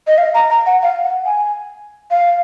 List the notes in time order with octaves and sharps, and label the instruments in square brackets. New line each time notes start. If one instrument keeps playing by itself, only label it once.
[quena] D#5
F5
A#5
A#5
F#5
F5
F#5
G#5
F5